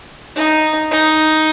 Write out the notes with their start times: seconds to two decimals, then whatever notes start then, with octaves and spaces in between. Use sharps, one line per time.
0.36 D#4
0.91 D#4